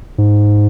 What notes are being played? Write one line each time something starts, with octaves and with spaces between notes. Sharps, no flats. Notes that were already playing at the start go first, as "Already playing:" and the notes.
G#2